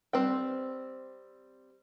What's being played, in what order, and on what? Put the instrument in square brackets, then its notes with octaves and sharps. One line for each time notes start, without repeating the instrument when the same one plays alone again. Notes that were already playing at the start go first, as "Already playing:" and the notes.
[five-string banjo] G3 C4 B4 G5